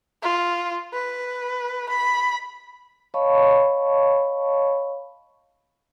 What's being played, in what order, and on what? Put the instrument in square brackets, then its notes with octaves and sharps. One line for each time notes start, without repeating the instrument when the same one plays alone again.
[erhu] F4
B4
B5
[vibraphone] C#5 D#5 F5 A5 B5 C#6